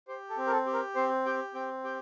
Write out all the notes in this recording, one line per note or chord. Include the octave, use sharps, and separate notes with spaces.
G4 C5
A4
C4
A#4
A4
G4
A#4
C4 C5
G4 G5
C4 G5
G4 G5